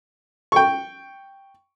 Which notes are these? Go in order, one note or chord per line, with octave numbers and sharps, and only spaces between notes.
G5 C#6